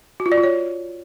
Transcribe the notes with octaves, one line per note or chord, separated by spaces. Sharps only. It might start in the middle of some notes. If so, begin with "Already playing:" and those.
F#4
F4
D5
F4
C#5